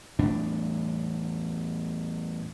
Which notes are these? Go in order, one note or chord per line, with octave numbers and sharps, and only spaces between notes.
E2 A2 D4